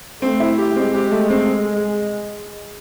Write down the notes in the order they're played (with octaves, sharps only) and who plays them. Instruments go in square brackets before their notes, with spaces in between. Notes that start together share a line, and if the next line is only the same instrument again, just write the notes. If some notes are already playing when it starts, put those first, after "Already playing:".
[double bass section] A3 [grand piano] C4
[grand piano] E4
G4
[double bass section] G#3 [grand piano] C4
[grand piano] G4
A3
C4